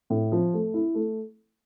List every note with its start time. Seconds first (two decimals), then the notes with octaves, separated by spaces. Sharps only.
0.10 A2
0.32 F3
0.53 A3
0.74 E4
0.94 A3